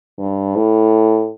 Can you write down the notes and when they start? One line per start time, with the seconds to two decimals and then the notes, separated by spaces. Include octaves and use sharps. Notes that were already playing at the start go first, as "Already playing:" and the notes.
0.18 G2
0.56 A2